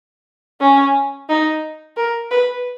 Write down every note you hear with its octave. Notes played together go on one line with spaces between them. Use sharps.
C#4
D#4
A#4
B4